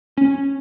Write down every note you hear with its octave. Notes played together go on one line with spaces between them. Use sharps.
C#4